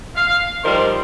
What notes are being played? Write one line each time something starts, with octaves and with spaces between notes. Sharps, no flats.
F5
D#3 F3 G3 A#4 C6